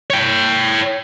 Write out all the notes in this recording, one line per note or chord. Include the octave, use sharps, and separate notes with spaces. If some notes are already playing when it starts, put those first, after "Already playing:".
C#5 G5